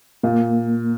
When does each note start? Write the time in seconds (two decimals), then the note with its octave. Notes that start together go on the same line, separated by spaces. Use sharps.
0.23 A#2 A#3